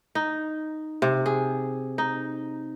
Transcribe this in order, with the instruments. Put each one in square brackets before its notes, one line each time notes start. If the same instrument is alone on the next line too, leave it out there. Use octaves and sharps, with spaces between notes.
[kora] D#4
C3
G#4
D#4